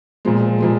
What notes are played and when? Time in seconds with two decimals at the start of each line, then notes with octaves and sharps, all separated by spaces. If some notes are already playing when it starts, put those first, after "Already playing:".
0.25 A#2 F3 G#3
0.60 A#2 F3 G#3